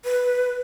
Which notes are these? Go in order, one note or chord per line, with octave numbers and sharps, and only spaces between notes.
B4